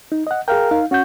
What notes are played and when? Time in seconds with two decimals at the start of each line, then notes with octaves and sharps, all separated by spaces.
0.12 D#4
0.27 D#5 F#5
0.48 G#4 A#4 F5 G5
0.71 D#4 F5
0.91 C#4 F#4 G6